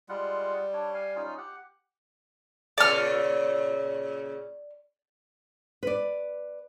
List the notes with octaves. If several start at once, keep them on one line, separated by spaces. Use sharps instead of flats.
G3 G#3 F4 F#5
D4 C#5
F5 G#5
C#4 D#4 F4
G4 F#5
A#2 C#3 A4 D5 F6
B4 D5